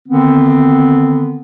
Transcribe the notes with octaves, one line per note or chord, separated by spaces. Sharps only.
D3 D#3 B3 C4